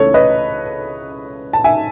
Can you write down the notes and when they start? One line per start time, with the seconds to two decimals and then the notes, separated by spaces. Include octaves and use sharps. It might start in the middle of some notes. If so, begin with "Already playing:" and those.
Already playing: C#2 C#3 E3 A3 C#4 A4 C#5
0.14 B4 D#5
1.53 A5
1.64 E5 G#5